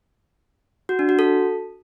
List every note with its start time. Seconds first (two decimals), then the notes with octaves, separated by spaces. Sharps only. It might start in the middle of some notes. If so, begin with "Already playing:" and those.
0.89 F#4
0.99 D4
1.09 F#4
1.19 A4